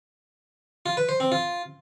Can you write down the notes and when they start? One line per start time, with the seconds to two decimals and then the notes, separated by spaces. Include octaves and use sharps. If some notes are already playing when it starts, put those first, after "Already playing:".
0.86 F4
0.97 B4
1.09 C5
1.20 C4
1.32 F4